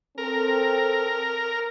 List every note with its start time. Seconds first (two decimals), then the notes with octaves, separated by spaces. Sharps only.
0.18 C4 A4 A#4